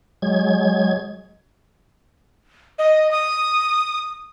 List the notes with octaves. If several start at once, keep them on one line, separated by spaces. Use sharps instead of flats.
F#3 G#3 G#6
D#5
D#6